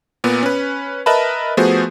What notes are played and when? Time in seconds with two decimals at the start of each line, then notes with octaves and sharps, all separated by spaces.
0.24 A#2 B3
0.43 C#4 B4
1.06 A#4 B4 D#5 E5 A5 B5
1.57 F3 A3 B3 F#4 G#4 C5